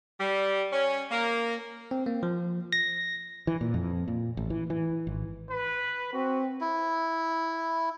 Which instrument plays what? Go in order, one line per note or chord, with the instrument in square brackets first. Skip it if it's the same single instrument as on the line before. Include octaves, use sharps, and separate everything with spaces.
[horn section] G3
C#4
A#3
[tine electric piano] C4
A#3
F3
A#6
[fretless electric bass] E3
A#2
F2
A#2
A1
E3
E3
G#1
[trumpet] B4
[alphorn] C4 [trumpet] F#4
[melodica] E4